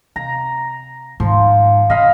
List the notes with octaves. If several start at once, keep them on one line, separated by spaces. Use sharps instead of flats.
C3 A#5
G#2 D#3 F3
C#3 D#5 F5 B5